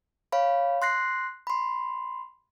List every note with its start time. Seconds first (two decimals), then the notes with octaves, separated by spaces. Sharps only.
0.32 C#5 F5 B5
0.82 C6 F#6 A#6 C7
1.47 B5 C6